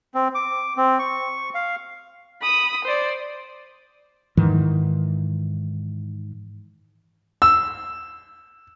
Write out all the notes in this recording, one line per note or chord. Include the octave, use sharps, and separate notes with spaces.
C4
D6
C4
C#6
F5
B5 D#6
C5 D5
G#2 D#3 E3
E6